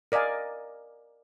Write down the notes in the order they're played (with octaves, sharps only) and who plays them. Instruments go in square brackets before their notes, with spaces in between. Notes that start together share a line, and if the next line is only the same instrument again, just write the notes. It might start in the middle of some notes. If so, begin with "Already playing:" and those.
[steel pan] A#4 D5 D#5 F5 G#5